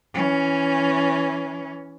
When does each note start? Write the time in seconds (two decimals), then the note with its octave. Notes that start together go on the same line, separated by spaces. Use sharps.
0.14 E3 C#4